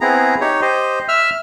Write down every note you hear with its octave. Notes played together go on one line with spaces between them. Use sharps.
B3 C4 E4 G#4 A#5
D#4 G4 C#5
G4 C5 D#5
E5 E6 F6